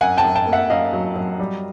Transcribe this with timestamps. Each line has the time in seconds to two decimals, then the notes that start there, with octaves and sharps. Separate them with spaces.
0.01 F#2 F#5 G#5
0.17 G5 A5
0.24 F#2
0.35 G5 A5
0.47 A#3
0.52 E5 F#5
0.70 F#2 D#5 F5
0.93 F#3
1.16 F#3
1.39 G3